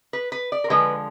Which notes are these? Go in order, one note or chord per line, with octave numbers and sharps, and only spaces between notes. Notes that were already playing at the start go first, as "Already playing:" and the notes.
B4
B4
D5
A#4
D3 F3 G#3 B4